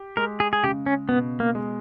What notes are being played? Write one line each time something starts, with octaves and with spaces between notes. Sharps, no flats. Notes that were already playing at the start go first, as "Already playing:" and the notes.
Already playing: G4
G#3 A#4
G#4
G#4
C#3 G4
C#4
B2 B3
A#3
G#3